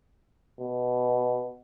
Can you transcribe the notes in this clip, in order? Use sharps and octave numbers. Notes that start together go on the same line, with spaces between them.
B2